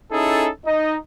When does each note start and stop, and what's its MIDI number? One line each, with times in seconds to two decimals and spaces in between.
0.12 0.48 61
0.12 0.48 63
0.12 0.48 64
0.12 0.48 68
0.12 0.48 69
0.65 0.95 63
0.65 0.95 75